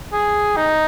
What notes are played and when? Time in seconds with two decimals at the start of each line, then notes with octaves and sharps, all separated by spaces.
0.13 G#4
0.57 D#4